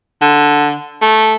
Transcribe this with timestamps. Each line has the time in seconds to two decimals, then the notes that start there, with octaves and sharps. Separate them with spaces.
0.22 D3
1.02 A3